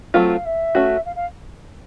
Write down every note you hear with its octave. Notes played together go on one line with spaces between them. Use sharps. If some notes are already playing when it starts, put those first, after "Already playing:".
F#3 A3 C4 F4 F5
E5
A3 C#4 F#4
F5
F5